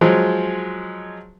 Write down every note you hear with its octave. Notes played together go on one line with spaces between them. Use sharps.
F3 F#3 G#3